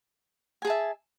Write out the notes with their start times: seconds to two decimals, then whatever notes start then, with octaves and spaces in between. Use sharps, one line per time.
0.62 G#5
0.65 G#4
0.67 A5
0.70 E5